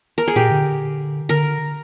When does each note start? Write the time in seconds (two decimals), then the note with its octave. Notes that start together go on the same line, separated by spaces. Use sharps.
0.18 A#4
0.28 G#4
0.36 A#2 G4
0.51 D3
1.29 D3 A#4